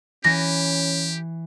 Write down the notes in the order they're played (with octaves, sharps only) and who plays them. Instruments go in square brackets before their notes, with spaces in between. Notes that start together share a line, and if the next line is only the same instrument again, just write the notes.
[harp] E3 [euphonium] C#4 [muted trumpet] G4 [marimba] A#6